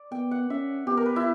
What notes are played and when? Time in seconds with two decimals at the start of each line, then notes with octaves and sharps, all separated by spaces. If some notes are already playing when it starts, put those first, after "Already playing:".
Already playing: D5
0.11 B3 G5
0.31 F#5
0.50 C#4 E5
0.87 B3 G4
0.97 A#4
1.06 B4
1.16 E4